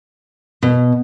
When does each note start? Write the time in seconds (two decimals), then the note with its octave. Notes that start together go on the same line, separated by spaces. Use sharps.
0.62 B2